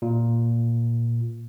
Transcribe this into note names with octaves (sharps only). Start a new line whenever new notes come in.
A#2